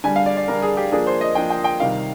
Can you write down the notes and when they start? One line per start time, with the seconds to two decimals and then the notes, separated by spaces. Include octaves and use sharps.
0.04 D3 G3 D4 G#5
0.16 F5
0.26 D5
0.37 D5
0.48 D3 G3 D4 A#4
0.62 G#4
0.77 G4
0.92 F3 A#3 D4 G#4
1.07 C5
1.21 D#5
1.35 F3 A#3 D4 G5
1.50 G5
1.64 G5
1.79 C3 D#3 G3 F5